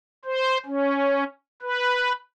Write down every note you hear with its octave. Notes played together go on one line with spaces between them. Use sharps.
C5
C#4
B4